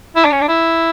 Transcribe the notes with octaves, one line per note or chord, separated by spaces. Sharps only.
E4
D4
C#4
D4
E4